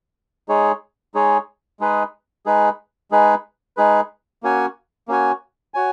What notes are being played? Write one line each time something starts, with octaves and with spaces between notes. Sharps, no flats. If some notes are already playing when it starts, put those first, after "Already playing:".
G#3 D#4 G#4 C#5
G#3 D#4 G#4 C#5
G#3 D#4 G#4 B4
G#3 D#4 G#4 B4
G#3 D#4 G#4 B4
G#3 D#4 G#4 B4
A#3 C#4 F#4 C#5 G#5
A#3 C#4 F#4 C#5 G#5
F#4 C#5 G#5